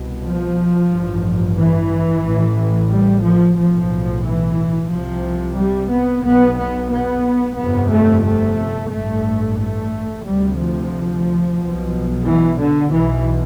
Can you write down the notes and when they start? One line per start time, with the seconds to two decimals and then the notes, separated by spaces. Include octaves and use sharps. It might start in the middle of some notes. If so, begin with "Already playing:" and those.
Already playing: C2 B2
0.23 F3
0.90 A1 G2
1.57 E3
2.23 A1 A2
2.91 G3
3.23 F3
3.57 B1 A2 F3
4.24 E3
4.90 C2 C3 F3
5.57 G3
5.91 B3
6.24 B1 B2 B3
6.58 B3
6.91 B3
7.57 G1 F2 C3 B3
7.91 A3
8.24 A3
8.91 A1 G2 A3
9.58 A3
10.24 D2 C3 G3
10.58 F3
11.58 B1 B2
12.25 E3
12.59 D3
12.91 B1 B2 E3